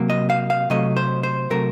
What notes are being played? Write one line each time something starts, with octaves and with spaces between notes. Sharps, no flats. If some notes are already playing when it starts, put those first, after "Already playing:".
Already playing: C3 F#3 A#3
D#5
F5
F5
C3 F#3 A3 D#5
C5
C5
C3 F#3 A3 A#4